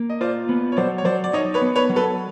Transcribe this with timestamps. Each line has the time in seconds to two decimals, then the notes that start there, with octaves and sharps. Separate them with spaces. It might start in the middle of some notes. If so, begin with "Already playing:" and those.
Already playing: A#3
0.10 D#5
0.21 F4 C5 D5
0.49 B3
0.72 C#5
0.77 F#3 C5 D5
0.98 C#5
1.05 F#3 C5 D5
1.24 D5
1.33 D#4 C#5 D#5
1.54 B4 C#5
1.62 B3
1.76 B4 C#5
1.89 F#3
1.96 A4 B4